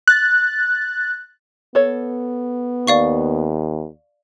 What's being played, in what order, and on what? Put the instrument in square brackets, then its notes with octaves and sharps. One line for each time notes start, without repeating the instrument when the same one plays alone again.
[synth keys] F#6 A6
[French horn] B3 [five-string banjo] A4 C#5
[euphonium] D#2 [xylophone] D5 F5 C#6